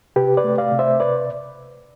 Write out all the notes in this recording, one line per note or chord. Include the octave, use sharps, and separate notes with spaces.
C3 G4 B4
B4 D5
A3
D5 F5
C3
C5 E5
B4 D5